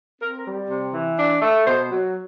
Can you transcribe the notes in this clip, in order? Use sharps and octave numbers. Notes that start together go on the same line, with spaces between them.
C4 A#4
A#4
G3
C3
E3
D4
A3
B2 C5
F#3